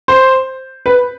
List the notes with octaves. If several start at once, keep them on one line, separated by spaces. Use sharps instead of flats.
C5
B4